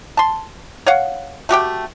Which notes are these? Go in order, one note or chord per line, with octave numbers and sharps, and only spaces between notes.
A5 C6
C#5 F5 F#5
A3 F#4 G4 G5